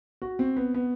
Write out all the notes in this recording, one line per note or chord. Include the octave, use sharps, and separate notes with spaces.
F#4
C4
B3
B3